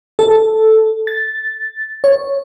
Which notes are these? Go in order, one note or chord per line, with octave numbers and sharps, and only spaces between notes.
A4
A6
C#5